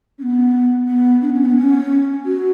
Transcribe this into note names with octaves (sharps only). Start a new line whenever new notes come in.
C#4
B3
B3
D4
C#4
B3
C#4
F#4